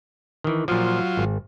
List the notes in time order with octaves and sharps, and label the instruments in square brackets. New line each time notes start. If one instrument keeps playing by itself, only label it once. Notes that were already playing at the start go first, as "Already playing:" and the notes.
[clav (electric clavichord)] D#3 E3
[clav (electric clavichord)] A#2 F3 [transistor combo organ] F#3 F4
[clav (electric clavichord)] G#1